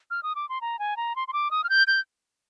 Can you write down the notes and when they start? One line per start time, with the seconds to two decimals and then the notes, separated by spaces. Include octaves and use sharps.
0.11 F6
0.23 D#6
0.35 D6
0.49 C6
0.61 A#5
0.79 G#5
0.97 A#5
1.16 C6
1.28 C6
1.33 D6
1.51 D#6
1.64 F6
1.69 G6
1.87 G6